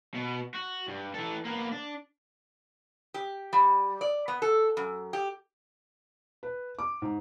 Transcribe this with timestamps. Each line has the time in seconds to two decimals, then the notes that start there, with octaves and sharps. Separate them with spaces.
0.15 B2 B3
0.55 F#4
0.88 G2
1.14 E3 A4
1.45 A#3 B3
1.72 D4
3.14 G4
3.53 G3
4.01 D5
4.28 B3
4.42 A4
4.77 F#2
5.13 G4
6.43 B4
6.79 D6
7.02 G#2